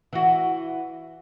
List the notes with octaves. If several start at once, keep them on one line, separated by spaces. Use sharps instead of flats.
E3 F#4